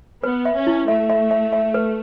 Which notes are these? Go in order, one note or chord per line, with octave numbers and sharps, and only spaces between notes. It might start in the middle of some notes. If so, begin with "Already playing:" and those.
B3 B4
E5
C#4
E4
A3 E5
E5
E5
E5
B4